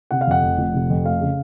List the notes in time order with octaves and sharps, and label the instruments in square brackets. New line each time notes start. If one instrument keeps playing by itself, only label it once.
[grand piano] C3 F#5
F5
F2 F#5
F1
F1
C3
F2
A3 F5
C#3